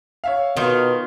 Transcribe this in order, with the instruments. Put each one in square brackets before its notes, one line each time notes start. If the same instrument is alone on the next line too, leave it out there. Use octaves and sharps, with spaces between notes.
[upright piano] C#5 E5 F5
[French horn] B2 [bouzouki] D#3 F4